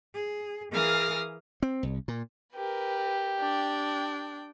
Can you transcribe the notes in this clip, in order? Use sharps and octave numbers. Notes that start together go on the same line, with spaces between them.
G#4
E3 G#4 A#4 F5 D#6 F6
C4
C2
A#2
G4 A#4 B4
D4 G5